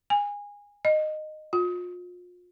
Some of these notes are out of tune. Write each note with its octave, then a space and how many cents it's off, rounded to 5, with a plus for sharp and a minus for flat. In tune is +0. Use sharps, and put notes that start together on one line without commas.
G#5 -25
D#5 -15
F4 +35